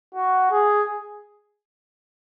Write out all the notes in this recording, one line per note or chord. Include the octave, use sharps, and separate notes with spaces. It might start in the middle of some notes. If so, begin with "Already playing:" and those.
F#4
G#4